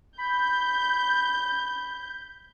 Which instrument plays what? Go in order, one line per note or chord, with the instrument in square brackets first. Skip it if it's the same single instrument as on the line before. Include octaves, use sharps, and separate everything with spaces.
[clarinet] B5 [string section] G6